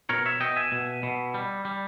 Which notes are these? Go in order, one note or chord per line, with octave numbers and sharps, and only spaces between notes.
B2 A#4 C#5
C#5 E5
B2 D#5 G5
E5 G#5
B2
B2
G3
G3